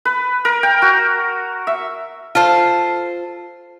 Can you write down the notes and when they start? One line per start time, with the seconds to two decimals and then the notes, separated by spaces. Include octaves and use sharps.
0.05 B4
0.45 A#4
0.63 G5
0.82 F#4
1.67 E5
2.35 F4 A4 C5